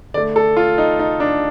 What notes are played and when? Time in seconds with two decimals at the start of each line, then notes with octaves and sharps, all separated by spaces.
0.14 D3 D5
0.17 A3
0.36 A4
0.57 F4
0.78 D#4
0.99 D#4
1.20 D4